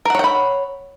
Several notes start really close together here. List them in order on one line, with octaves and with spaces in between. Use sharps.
A#4 F#5 C#5 G5 B5